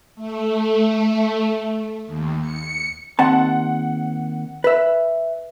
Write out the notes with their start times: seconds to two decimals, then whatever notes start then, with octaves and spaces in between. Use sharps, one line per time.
0.15 A3
2.06 D#2
2.41 C#7
3.19 D#2 C4 F#5 A5
4.64 B4 E5